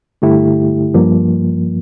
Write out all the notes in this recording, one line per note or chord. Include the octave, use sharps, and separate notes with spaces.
G2 D3 A3 E4 G4
G2 F3 A#3